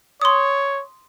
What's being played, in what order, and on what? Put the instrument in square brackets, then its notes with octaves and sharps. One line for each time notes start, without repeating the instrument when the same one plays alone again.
[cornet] C#5 [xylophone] C6 D#6